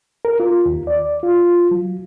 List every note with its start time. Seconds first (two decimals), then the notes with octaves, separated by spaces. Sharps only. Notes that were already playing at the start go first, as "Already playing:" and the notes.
0.25 A#4
0.40 F4
0.66 D#2
0.87 D5
1.23 F4
1.71 F#3